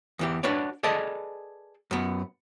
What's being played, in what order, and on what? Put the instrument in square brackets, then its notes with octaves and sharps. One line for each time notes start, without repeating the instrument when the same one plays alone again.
[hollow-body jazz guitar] E2 E3 G4
D4 F#4 B4 C#5 D5
G#4 A4 B4 D5 D#5 A5
F#2 B3